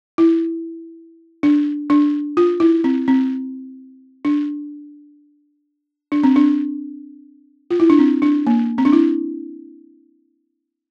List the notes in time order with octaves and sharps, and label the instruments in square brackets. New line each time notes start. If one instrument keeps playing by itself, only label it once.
[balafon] E4
D4
D4
F4
E4
C4
C4
D4
D4
C4
D4
F4
E4
D4
C4
D4
A#3
C4
D4
E4